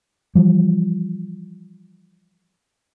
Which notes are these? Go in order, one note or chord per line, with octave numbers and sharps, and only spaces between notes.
E3 F3 G3